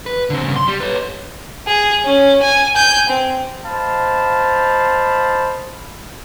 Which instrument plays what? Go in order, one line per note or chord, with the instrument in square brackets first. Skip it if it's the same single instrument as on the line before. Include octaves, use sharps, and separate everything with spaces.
[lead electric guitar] B4
D3 C4
G2 C#3
C6
G3
B4 C#5
[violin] G#4
C#4
G#5
G#5 G6
C4
[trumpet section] C5 D#5 F5 A5 B5